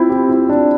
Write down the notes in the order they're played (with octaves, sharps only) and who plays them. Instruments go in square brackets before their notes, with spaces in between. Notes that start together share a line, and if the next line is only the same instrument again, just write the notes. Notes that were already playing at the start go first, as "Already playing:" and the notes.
Already playing: [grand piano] C4 E4 [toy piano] F4 C5
[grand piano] G4
E4
D4